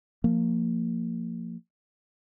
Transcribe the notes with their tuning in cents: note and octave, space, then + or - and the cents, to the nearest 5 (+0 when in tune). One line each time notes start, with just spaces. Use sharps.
F3 +0 A#3 -20